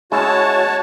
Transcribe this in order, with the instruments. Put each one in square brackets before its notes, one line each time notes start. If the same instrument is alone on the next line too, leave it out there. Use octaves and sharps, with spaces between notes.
[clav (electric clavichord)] G#3 C#4 E4 [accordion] F#4 C#5 A5